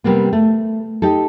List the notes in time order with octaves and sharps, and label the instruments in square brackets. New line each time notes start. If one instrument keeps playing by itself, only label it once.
[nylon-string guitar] C3 G3 A#3 B3
A3
D#4 G4 A4